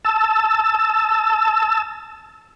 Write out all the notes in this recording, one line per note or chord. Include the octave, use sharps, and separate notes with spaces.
A5 E6